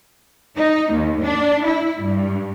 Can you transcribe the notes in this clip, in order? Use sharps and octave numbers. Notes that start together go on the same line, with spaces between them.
D#4
D#2
D4
E4
G2